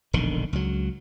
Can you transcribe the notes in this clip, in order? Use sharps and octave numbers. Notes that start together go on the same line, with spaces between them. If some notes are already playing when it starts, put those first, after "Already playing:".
E1 A#1 D3 D#3
C#2 F#3